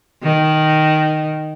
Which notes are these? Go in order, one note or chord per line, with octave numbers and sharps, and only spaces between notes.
D#3